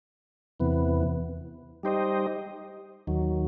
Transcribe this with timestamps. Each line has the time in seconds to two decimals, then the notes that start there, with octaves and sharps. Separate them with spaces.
0.60 E2 C3 E3 B3
1.83 G3 D#4 G4 C5 D#5
3.07 D#2 D#3 F#3